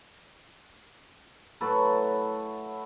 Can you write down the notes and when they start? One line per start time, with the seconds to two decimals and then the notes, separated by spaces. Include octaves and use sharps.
1.61 A2 F#3 A4 B4